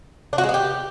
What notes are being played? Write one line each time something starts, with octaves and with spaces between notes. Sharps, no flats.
D4
F#4
G#3
B3
G4